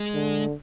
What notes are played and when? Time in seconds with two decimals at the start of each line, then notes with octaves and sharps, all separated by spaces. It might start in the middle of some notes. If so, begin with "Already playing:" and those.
Already playing: G#3
0.14 D3